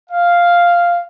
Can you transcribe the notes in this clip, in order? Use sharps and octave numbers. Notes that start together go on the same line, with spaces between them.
F5